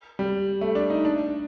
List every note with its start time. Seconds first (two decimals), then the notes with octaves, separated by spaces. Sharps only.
0.19 G3
0.61 A3
0.75 D4
0.90 D#4
1.05 D4